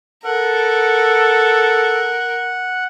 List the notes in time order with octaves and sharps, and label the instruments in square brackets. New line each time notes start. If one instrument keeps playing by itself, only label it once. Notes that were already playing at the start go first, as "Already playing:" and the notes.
[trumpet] A4 [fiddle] A#4 [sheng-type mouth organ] F#5